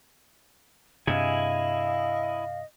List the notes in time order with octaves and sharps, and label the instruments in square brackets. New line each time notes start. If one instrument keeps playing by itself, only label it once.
[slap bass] G2 C3 [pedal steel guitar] E4 G#4 G#5 [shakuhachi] D#5 [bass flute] F5